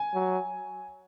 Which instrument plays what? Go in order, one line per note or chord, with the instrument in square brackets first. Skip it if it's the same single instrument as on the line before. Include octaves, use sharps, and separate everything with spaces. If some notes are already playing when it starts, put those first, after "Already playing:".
Already playing: [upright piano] G#5
[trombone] F#3